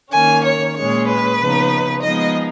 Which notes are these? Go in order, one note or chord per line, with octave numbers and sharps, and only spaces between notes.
D#3 A#3 C#4 G#5
C#5
A#2 G#3 C#4 C#5
B4
C#3 F3 B3 D#4
F3 G#3 B3 D#4 D#5